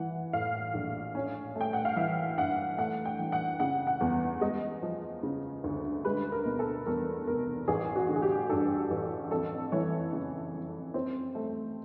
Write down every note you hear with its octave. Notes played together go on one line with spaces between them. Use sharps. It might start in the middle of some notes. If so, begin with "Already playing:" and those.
Already playing: E3 F#5
A2 F5
A#1
C#4
A3
G5
F#5
F5
E3 E5
G2 F#5
A3 F#5
G5
E3
F#5
C#3 F#5
F#5
E2
G#3 D#5
F3
C#3
D2
G#3 B4
A#4
B2
A4
E2 A#4
F1 A#4
A1 G#4
F#4
D3
G#4
G4
G2 A4
A1
F2 A4
E3 C#5
C#3
F2
C4
A3